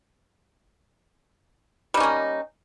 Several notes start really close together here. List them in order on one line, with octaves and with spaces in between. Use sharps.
G3 D#4 C#4 A#3